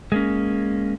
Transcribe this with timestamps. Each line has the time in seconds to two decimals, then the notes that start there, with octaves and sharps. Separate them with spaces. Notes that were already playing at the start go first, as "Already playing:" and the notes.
0.12 G#3 A#3 C#4